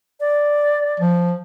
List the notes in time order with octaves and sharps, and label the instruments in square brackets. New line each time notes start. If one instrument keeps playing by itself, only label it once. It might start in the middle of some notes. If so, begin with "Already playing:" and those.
[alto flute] D5
[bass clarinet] F3